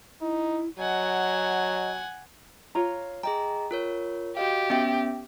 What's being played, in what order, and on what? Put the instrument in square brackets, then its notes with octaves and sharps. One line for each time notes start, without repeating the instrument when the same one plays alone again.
[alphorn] D#4 [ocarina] E4
[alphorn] F#3 [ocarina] D#5 [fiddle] F#5 G#5
[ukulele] F4 C#5 A#5
[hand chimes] G#4 D#5 A#5 [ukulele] G5
[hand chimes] F4 A#4 C#5
[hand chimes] F#4 D#5 F5 [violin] G4
[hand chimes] B3 C#4 E5 [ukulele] G5